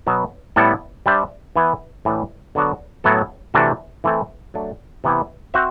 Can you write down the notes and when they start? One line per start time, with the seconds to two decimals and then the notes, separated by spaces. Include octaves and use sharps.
0.07 B2 F#3 B3
0.56 A2 G3 B3 E4 A4
1.06 G3 D4 G4 C5 E5
1.56 E3 B3 E4 B4 E5
2.05 A2 E3 A3 D4
2.55 D3 F#3 B3 D4 F#4
3.04 A2 F#3 B3 E4 A4
3.54 C3 E3 A3 D4 F#4
4.04 E3 A3 C4 E4 A4
4.54 F#3 A3 D4
5.04 C3 E3 B3 E4 G4
5.54 C4 F#4 C5 E5